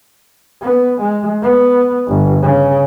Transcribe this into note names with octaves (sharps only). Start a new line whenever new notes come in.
B3
G#3
B3
G1
C#3